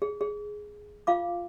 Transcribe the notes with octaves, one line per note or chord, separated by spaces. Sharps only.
G#4
G#4
F4 F5 D6